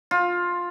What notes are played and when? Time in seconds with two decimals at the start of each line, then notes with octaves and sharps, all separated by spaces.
0.11 F4